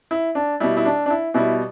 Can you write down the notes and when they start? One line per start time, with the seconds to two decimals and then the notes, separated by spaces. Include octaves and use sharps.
0.11 E4
0.35 D4
0.60 B2 G3 E4
0.77 E4
0.85 D4
1.06 D4
1.10 E4
1.34 B2 G3 E4